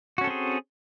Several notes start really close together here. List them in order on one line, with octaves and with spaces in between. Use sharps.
F#4 C#4 A4 C4 G#4